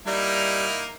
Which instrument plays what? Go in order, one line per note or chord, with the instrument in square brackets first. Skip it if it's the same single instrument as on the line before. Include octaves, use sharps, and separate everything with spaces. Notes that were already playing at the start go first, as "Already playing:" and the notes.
[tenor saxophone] G3 [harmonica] A#3 D#4 E4